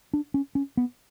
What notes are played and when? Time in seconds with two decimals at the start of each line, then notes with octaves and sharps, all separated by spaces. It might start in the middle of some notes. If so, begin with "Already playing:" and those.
0.14 D4
0.34 C#4
0.55 C#4
0.77 B3